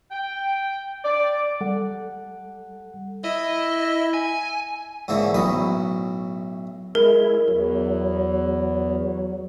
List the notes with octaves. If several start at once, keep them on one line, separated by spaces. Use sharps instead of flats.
G5
D5
G3 A4 F#5
E4 D#5
G#5
G#2 D3 E3 A#3 C#4
B1 A2 F#3 B4 D#6
G#3 E4 A#4
E2 F#3